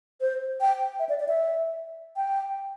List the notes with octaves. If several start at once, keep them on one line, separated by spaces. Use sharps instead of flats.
C5
G5
E5
D5
D5
E5
G5